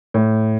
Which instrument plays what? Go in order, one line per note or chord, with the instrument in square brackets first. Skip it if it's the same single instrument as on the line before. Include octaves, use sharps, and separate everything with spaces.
[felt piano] A2